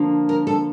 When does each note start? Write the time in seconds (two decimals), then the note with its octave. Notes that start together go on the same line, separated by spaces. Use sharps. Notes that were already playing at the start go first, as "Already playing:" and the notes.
Already playing: D3 F3 A#3
0.29 A#4
0.47 A4